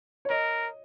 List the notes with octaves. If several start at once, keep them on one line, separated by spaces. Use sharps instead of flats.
C#5
A#4 D#5